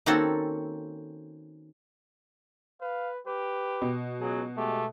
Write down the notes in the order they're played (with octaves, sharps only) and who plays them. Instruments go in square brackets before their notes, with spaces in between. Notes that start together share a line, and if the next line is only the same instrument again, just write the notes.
[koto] D#3 A#3 C4 C#4 F#4 A4
[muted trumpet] B4 [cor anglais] F5
[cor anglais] G4 [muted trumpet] B4
[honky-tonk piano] B2
[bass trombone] C#2 [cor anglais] F#3 [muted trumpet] G#4
[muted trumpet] G#3 [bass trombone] A3 [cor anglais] G4